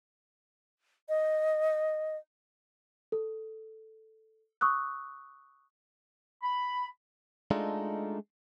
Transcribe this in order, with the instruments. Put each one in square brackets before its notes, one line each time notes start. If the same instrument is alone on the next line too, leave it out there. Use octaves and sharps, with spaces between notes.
[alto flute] D#5
[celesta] A4
C#6 D#6 E6 F#6
[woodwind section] B5
[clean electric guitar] G#3 A3 D4 D#4 F4 A4